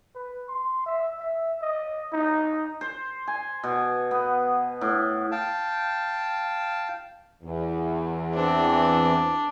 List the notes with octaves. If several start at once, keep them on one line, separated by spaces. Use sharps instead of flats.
B4
C6
E5
E5
D#5
D#4
C5
G#5
B2
B3
A2
F5 G5 A5
E2
E3 C4 D4